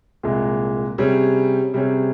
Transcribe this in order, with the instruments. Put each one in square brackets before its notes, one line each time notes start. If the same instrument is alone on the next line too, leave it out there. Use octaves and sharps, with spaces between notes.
[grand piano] C2 A#2 G#3
C3 G3 C#4 G#4
C3 G3 C#4 G#4